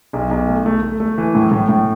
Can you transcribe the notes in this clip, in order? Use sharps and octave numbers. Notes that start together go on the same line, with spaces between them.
B1
B1
A3
A3
A3
A3
E3
A2
A2
A2